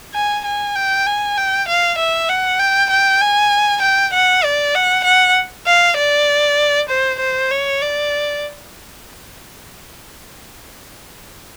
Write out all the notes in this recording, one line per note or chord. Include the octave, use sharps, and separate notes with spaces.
G#5
G#5
G5
G#5
G5
F5
E5
F#5
G5
G5
G#5
G5
F#5
D5
F#5
F#5
F5
D5
C5
C5
C#5
D5